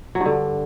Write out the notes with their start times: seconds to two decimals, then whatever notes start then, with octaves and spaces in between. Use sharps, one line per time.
0.15 F#3
0.20 G2
0.26 D3